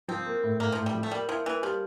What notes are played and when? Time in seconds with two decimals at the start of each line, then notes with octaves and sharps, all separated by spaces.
0.08 F3 C4
0.26 A#3
0.43 A2
0.60 A2 A#3
0.72 A2 F3
0.86 G3
0.94 F3
1.03 A3
1.11 G3 A#3
1.28 F3 E4
1.45 E3 A#3
1.63 F3 G3